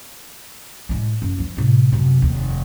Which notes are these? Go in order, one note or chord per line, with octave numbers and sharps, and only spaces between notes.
A2 G#3
F#2
F3 F4
A2 C3
F#2 C3
F1 D#2